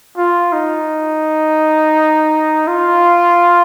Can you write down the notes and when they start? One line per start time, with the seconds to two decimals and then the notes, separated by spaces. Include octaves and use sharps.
0.17 F4
0.53 D#4
2.67 F4